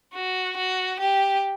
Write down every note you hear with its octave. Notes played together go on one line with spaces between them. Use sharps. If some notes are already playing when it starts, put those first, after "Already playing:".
F#4
F#4
G4